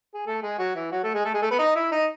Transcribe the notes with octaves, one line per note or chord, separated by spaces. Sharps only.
G#4
A3 A4
G#3 G#4
F#3 F#4
E3 E4
F#3 F#4
A3 A4
G#3 G#4
A3 A4
G#3 G#4
A3 A4
B3 B4
D#4 D#5
E4 E5
D#4 D#5